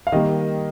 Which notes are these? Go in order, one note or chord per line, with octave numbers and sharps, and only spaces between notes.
F5
D#3 G3 A#3 D#5